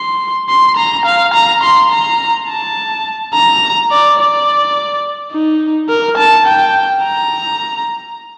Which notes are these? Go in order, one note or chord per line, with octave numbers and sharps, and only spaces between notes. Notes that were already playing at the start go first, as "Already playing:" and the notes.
Already playing: C6
C6
A#5
F5
A#5
C6
A#5
A5
A#5
D5
D5
D#4
A#4
A5
G5
A#5